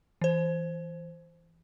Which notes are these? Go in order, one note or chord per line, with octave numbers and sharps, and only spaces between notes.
E3 C5